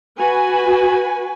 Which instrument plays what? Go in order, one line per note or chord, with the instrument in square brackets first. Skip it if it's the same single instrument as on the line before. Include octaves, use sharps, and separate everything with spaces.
[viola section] F#4 B4 G#5